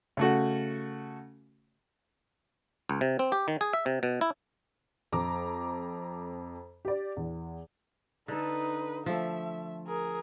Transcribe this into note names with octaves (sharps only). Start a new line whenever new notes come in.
C#3 A3 F#4
C#2
C3
C4
G4
D#3
G#4
E5
C3
B2
E4
F2 A#5 D6
G4 D5
E2
D3 D#4 A4 B4
F3 A3 E5
G#4 A#4